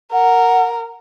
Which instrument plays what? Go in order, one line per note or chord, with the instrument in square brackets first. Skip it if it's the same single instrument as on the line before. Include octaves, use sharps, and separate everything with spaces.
[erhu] A#4 [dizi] F#5